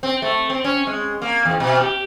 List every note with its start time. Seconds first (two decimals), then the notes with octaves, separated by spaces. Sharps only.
0.03 C4
0.22 A3
0.50 C4
0.64 C#4
0.87 G#3
1.22 A#3
1.45 E2
1.60 B2
1.81 G4